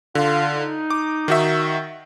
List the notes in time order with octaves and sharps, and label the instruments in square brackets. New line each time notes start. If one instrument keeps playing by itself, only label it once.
[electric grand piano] D3 [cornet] F4
[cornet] D#4
[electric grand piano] D6
D#3 F#4 E5